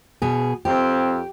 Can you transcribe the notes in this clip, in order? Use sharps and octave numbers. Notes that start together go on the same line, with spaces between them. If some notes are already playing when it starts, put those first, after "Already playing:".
B2 G#4
F2 C4 G4